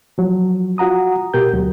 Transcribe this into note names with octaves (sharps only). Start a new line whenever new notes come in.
F3 F#3
F4 F#4 F#5 A#5 D#6
B2 G4 A#4 G6
D2 F#3